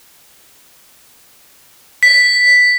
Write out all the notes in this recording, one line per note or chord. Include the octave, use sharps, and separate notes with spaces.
B6